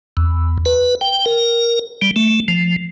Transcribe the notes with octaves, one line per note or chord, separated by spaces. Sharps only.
E2
B4
G5
A#4
G3
A3
F3